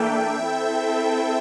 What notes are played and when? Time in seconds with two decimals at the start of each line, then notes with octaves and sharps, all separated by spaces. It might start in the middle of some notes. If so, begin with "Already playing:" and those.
Already playing: E3 A#3 D4 A4 E5 G5
0.44 C4 E4 A4